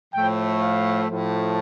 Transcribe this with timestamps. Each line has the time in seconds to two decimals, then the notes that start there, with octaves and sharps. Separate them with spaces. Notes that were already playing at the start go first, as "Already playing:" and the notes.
0.14 A2 F3 A3 G5
0.61 F5
1.09 A2 F3 A3